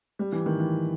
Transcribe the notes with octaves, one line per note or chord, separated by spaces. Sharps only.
G3
E3
D#3
E3